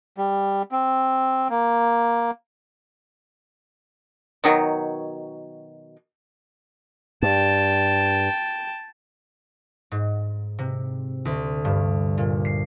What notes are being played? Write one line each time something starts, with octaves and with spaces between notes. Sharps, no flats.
G3
C4
A#3
B2 D#3 F#3
G2 G5 A5
G#2
C3
D2
G2
A#2
C7